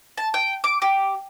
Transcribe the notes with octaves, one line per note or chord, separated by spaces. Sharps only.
A5
G5
D6
G4